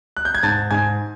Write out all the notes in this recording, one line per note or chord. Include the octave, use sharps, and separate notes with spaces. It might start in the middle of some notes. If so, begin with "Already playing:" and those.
F#6
G6
G#6
G#2 A5 A6
G#2 G#5 G#6